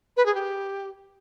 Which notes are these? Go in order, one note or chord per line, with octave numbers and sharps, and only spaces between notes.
B4
G#4
G4